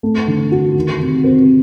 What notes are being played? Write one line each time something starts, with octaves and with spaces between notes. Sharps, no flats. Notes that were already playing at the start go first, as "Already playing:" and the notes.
A3
D3
F#4
D#3
C3
C4